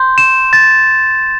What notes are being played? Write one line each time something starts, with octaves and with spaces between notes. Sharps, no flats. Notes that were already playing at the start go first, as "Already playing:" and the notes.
Already playing: C6 G6
E7
A6